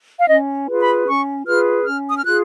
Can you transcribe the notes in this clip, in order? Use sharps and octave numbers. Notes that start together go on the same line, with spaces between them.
F5
C#4 D#5
F4 G#4 B4
B5
C#4 C#6
F4 G#4 B4 F6
C#4 F6
D#6
F6
F4 G#4 F#6